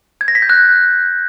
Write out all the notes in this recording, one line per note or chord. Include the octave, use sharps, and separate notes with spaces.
G#6
A#6
B6
G6
F#6